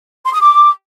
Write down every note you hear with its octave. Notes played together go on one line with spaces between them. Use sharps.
C6
D#6
D6